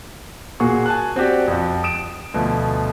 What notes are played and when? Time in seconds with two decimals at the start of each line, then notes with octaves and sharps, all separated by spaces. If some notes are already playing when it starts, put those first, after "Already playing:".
0.60 A#2 A#3 F#4 G#4 C#6
0.86 G#5 A5 F#6
1.16 C4 F#4 G4 D5
1.48 F2 F3
1.84 D#6 D7 E7
2.34 D2 B2 F3